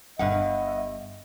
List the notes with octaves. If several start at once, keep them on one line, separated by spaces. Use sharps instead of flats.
G1 G2 D#5 E5 F#5